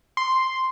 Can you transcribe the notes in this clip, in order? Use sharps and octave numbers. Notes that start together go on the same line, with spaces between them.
C6